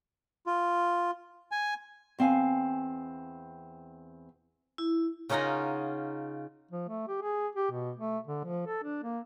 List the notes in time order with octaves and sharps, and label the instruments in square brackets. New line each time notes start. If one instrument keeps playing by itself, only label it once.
[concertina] F4
G#5
[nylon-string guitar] E2 C4 F5 G#5
[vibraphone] E4
[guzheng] C#3 C#4 D#4 F4 F#5 A#5
[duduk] F3
A3
G4
G#4
G4
B2
A3
D3
F3
A4
D4
A#3